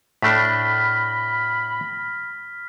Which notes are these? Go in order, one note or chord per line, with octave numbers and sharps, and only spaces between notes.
A2 A3 D4 B5 F6 A#6 B6